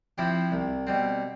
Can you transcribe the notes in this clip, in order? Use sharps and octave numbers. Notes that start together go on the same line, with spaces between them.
F3 C4 E4 G4
C2
B2 G3 C4